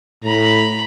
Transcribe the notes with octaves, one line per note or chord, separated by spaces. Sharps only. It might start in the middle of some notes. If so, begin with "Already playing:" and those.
A2 A#5 B5